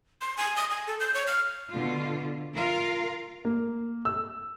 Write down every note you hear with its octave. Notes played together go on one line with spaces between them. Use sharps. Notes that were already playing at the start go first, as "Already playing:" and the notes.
C6
G#5
D#6
G#5
A4
G6
C#5
F6
B2 D3 F4
F4 A#4 F5
A#3
E6